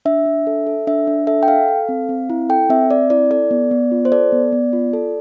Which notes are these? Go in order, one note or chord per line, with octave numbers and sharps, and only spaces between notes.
D4 E5
D4
A4
A4
D4 E5
D4
A4 E5
G5
A4 F5
A4
C4
C4
E4
A4 G5
C4 E5
C4 D5
E4 D5
A4 D5
B3
B3
F4
C5
A4 D5
B3
B3
F4
A4